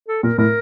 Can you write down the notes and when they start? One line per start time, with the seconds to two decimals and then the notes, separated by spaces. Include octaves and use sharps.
0.08 A4
0.23 A#2 A#4
0.38 A2 A#4